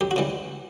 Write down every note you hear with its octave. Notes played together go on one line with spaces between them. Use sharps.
F#2 G4
F#4
C#3 E3 G3